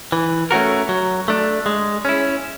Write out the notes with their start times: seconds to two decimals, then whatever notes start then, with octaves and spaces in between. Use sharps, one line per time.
0.12 E3
0.51 A3 C#4 F#4 A#4
0.89 F#3
1.28 A3 D4
1.66 G#3
2.05 C#4 E4